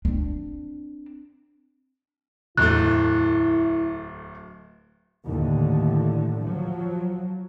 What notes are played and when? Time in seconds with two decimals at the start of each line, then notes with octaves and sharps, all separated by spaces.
0.05 C4 D4
2.57 D1 E2 A2 E3 A3 E4 F#6
5.27 D#2 A2 D3
6.43 F3 F#3